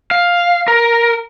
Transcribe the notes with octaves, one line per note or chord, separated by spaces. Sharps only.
F5
A#4